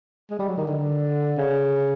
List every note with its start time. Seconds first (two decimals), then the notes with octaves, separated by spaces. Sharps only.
0.31 G#3
0.39 G3
0.48 F#3
0.58 D#3
0.67 D3
1.38 C#3